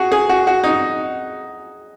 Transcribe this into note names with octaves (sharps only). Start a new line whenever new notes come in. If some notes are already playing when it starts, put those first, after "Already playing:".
Already playing: F#4 G#4
G#4
F#4
F#4
D#4